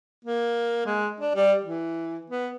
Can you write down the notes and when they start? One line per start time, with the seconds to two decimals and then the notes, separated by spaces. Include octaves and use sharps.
0.25 A#3
0.86 G#3
1.20 D4
1.35 G3
1.63 E3
2.30 B3